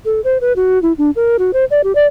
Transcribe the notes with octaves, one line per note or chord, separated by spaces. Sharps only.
A4
C5
B4
F#4
E4
D4
A#4
F#4
C5
D5
G4
D5